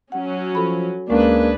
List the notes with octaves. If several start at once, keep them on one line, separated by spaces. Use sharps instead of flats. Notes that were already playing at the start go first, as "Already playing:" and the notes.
F#3 C#4 F#5
F3 A4 B5
D2 G#3 A#3 C#4 D4 G#4 B4